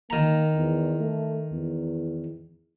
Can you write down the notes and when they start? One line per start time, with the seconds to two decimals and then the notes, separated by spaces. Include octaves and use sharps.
0.10 D#3 A#3 A#5
0.56 E2
1.00 A3
1.52 E2